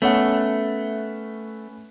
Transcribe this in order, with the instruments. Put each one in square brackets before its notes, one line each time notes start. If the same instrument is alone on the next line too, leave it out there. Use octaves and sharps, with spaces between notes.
[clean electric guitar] A3 [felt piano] B3 C#4 F#5